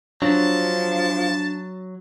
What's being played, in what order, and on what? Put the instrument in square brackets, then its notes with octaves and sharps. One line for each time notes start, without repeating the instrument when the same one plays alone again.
[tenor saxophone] F3 [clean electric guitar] F#3 [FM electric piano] D4 [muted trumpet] A5